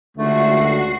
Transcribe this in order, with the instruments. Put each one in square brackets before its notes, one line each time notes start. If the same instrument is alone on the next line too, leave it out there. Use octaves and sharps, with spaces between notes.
[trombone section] C#2 D3 [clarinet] A3 [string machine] F#4 C7